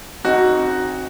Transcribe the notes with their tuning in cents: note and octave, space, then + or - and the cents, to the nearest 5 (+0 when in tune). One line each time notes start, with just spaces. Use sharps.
C4 +35 D#4 +0 F#4 +0